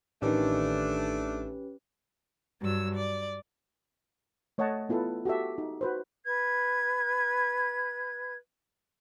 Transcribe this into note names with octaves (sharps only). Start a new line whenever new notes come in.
A1 D#3 A3 C#4 D4 G4 B4
G2 F#3 E6
D5
A3 C#5 D#5 F#5 A5
B3 E4 F4 A4 B4
F#4 G4 A4 E5
D#4
F#4 B4 C5
B4 G#6